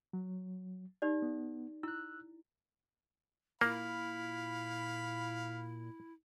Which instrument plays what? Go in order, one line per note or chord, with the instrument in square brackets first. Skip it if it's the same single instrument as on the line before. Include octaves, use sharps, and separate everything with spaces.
[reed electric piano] F#3
[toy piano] D#4 G4 D5
[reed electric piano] B3
[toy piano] E4 [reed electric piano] E6 F#6
[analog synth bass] A#2 [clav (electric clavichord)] A#3 [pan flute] E4 [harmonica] F5 B5